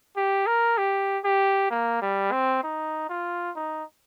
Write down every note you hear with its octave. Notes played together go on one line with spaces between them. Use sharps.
G4
A#4
G4
G4
A#3
G3
C4
D#4
F4
D#4